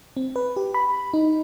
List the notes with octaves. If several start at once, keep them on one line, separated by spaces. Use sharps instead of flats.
C4
B4
G4
B5
D#4